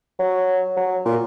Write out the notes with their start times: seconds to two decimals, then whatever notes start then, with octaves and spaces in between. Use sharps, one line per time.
0.19 F#3
0.77 F#3
1.05 A#2